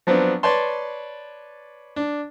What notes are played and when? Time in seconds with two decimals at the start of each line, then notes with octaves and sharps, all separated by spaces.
0.07 F3 F#3 B3 C4 D4
0.43 B4 C#5 D5 A5 C6
1.96 D4